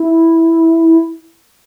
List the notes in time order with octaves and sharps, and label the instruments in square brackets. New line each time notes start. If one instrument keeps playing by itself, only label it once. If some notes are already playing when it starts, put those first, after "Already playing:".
Already playing: [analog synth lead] E4